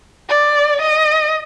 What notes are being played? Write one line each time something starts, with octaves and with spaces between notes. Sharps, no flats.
D5
D#5